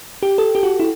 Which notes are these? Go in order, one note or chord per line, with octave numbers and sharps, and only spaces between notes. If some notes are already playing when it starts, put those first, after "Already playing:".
G4
A4
G4
F#4
E4